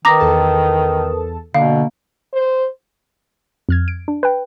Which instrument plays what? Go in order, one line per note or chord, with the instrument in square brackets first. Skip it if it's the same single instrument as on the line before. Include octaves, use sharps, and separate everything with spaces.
[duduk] D#3 [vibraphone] A#4 B4 D#6 [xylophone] A#5 D6 A#6
[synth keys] E2 A4 A5
[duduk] B2 [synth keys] D3 [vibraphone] A#3 [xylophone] F5
[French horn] C5
[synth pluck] F2 F6 G#6
D7
D4
B4 G5